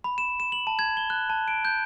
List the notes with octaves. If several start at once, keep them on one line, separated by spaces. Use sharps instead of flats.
B5
E7
E7
F#7
A5
G#6
G7
F#6
A5
D7
G6